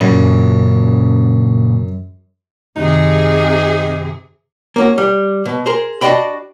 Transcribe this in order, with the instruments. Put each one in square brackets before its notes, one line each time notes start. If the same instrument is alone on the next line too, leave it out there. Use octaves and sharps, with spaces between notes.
[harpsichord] F#2 [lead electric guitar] A#2 C#3
[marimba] F#2 D#3 [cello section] C3 G#4 [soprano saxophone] D#4
[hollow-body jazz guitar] A#3 C#4 F#4
G3
B2
G#4 A#4 C5
D4 F#4 D5 D#5 G5 B5